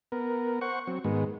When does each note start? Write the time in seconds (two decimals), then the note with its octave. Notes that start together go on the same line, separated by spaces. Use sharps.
0.12 B3 A#4
0.61 C5 F#5 C#6
0.87 F#3 C4
1.04 G#2 D#3 G#3 B3